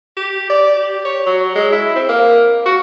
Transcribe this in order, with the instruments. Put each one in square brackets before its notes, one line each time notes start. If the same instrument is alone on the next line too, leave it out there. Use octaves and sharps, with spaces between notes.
[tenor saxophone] G4
D5
G4
C#5
F#3
G#3
E4
C4
A#3
F#4